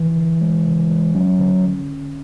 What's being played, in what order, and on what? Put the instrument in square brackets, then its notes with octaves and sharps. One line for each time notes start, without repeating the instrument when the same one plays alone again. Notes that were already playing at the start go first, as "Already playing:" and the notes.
Already playing: [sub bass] E3
[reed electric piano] D3
G#3
C#3
G#3
[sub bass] F#3 [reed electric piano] C#4
[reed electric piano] D3